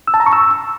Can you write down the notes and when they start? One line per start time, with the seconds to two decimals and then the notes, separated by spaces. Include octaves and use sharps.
0.08 E6
0.14 A5
0.20 A#5
0.26 C#6
0.33 E6